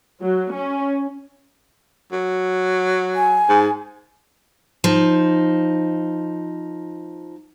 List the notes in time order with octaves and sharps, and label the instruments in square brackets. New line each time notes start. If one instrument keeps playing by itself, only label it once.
[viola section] F#3
C#4
[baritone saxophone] F#3
[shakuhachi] G#5
[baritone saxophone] G#2
[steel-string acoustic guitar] F3 D#4